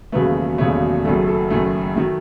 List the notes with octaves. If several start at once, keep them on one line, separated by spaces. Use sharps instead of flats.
E1 D#2 C#3 F#3 A3 B4
E1 D#2 C#3 F#3 A3 C#5
F#1 F#2 D#3 F#3 A3 A4
A4
F#1 F#2 D#3 F#3 A3
D#3 F#3 A3